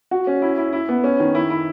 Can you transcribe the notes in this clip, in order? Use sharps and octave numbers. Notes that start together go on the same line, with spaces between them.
F#4
C#4
E4
E4
E4
B3
C#4
D#3
E4
E4